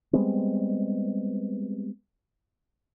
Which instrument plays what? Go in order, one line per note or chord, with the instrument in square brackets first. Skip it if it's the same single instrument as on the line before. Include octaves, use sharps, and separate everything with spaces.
[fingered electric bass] G3 G#3 B3 C4